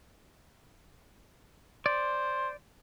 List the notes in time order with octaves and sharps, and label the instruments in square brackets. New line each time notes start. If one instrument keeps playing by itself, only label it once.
[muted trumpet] C5 [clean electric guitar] D5